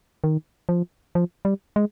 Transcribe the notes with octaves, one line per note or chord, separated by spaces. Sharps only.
D#3
F3
F3
G3
G#3